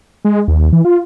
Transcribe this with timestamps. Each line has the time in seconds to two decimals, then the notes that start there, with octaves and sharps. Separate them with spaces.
0.25 G#3
0.48 D#2
0.59 D#2
0.73 E3
0.85 F4